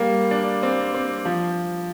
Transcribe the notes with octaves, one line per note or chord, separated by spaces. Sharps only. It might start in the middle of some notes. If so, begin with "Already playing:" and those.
Already playing: G3 A#3
D4
C4
C4
F3